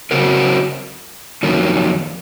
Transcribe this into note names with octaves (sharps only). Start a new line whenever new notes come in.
C#3 F#3 C4 F#4 A#4
F2 D#3 F#3 A#3